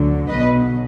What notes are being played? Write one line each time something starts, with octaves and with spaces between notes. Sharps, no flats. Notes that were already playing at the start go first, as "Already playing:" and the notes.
Already playing: D2 D3 F#3
B1 B2 F#3 B4 D#5